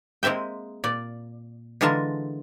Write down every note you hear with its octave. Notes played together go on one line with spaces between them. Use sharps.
G#3 A#3 C4 E5 G5
A#2 D5
D3 E3 G#3 F4 A#4 A5